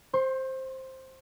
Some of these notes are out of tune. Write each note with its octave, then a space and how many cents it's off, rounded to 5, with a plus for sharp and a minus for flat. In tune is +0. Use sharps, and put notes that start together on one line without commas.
C5 +10 C6 +45